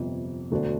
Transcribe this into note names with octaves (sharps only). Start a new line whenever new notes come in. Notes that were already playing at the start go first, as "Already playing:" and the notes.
Already playing: G1 F2 C3
E1 D2 D3 A3 D4